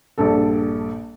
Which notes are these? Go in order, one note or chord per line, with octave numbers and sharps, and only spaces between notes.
A#1 G2 D4 A4